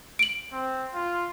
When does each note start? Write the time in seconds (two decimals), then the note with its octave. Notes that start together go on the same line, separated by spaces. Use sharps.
0.19 D7 F#7
0.52 C4
0.94 F4